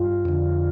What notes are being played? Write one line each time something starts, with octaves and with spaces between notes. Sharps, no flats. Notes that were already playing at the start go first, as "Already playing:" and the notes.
Already playing: G2 F4
F2 D3